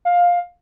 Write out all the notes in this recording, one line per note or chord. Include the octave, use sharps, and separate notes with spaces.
F5